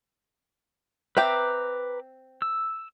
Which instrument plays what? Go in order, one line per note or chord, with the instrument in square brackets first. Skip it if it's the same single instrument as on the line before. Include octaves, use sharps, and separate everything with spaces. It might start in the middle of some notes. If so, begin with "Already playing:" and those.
[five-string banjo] C4 E5 G5 [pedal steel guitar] B4 A#5 D6
[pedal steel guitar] E6